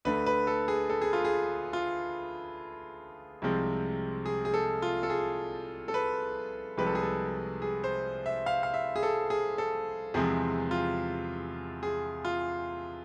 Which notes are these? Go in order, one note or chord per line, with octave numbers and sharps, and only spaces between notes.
D2 D3 A3 B4
B4
A4
G#4
A4
G#4
F4
G#4
F4
C2 C3 F3 G#3 C4
G#4
G#4
A4
F4
A4
G#4
A4
B4
C2 C3 F3 G#3 B4
A4
G#4
A4
G#4
C5
E5
F5
F5
E5
G#4
A4
G#4
A4
E2 C3 F3 G#3 C4 G#4
F4
G#4
F4